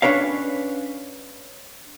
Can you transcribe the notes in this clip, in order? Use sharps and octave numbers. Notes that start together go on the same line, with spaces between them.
C#4 D4 B4 C#5 F5